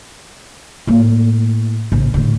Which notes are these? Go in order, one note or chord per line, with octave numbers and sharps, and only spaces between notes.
A2 A#3
A#1 C#3
A2 D3